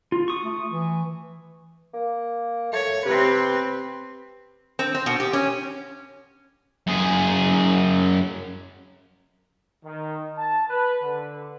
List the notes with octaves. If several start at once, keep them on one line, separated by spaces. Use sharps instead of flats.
F4
C#6 D#6
A3
E3
A#3
A3 C#5
C3 C4 B4
C4
C4
B2
G4
C#4
F#2 G#4
D#3
A5
B4
D3